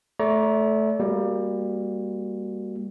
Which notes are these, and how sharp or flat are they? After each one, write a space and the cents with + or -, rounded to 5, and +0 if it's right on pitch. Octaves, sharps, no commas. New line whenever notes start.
A3 -15 D5 -40 A#5 +20
G3 +20 A#3 +0 F#4 +0